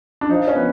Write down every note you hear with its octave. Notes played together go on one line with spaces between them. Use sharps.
D4
F3 D#4
C#4
B3